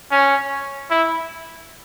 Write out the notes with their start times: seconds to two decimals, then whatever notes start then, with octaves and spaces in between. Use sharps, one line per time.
0.11 C#4
0.91 E4